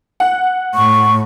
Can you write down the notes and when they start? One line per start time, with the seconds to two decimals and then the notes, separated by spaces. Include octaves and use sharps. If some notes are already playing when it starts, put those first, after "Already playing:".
0.20 F#5
0.75 A2 C#6